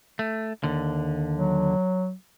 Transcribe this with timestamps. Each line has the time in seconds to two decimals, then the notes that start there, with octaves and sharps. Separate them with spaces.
0.19 A3
0.64 D#2 D3
1.35 F#3